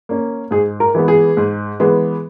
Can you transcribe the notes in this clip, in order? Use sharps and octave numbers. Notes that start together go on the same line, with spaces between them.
A#3 C#4
G#2 G#4
A#4
E3 G#3 B3
G#4
G#2
E3 G#3 B3